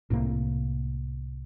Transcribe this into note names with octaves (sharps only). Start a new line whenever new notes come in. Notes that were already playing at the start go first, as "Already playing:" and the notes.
C2 A2 C3 A#3